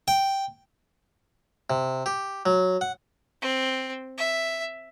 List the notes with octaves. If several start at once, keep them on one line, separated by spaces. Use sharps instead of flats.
G5
C3
G4
F#3
F#5
C4
E5